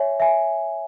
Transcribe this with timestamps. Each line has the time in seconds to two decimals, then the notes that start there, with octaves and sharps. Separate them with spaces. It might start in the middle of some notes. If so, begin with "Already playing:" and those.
Already playing: C#5 E5 G#5
0.20 E5 G#5